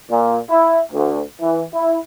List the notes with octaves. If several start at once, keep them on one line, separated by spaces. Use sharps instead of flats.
A#2
E4
D2
E3
E4